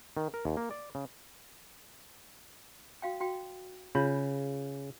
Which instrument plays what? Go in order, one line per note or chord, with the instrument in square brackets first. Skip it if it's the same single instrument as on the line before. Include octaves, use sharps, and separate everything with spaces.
[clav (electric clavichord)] D#3
A#4
D#2
A#3
D5
C#3
[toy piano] F#4 F5 G5
F#4 F5 G5
[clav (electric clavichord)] C#3 [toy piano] F4 C#5 B5